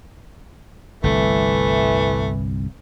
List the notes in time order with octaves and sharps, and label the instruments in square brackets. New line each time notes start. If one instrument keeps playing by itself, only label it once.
[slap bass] G1 C2 [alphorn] E3 [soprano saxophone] A3